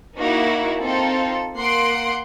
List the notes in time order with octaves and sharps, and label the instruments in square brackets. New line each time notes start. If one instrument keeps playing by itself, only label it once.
[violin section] A#3 D#4 E4 F#4
C4 D#4 F4 A4
A#3 F#5 C6 C7 D7